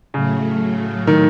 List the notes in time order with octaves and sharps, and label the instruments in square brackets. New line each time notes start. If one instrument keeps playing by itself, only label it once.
[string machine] A2 F#3 A3 [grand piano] C#3
[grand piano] D#3